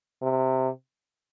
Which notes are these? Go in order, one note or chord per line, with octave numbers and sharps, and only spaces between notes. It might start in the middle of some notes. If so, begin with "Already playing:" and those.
C3